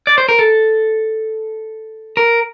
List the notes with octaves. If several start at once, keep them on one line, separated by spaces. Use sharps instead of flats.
D5
C5
A#4
A4
A#4